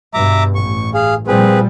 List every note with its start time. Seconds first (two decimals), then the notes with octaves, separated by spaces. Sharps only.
0.14 G2 B2 E5 A#5 D6
0.55 A1 C#6
0.94 G#4 F5
1.27 A#2 F3 G3 C4 G#4 B4